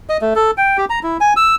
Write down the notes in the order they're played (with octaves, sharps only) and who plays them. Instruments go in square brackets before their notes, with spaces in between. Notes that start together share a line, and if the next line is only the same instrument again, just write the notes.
[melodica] D#5
A3
A4
G5
G4
A#5
E4
G#5
E6